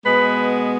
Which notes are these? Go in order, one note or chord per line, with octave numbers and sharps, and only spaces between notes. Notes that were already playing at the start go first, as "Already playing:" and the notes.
B2 G#3 B3 B4